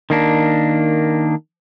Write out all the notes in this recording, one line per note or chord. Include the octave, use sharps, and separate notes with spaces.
D#3 A#3 D4